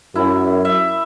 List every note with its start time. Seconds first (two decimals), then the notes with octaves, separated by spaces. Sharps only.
0.15 F#2 E4
0.65 E5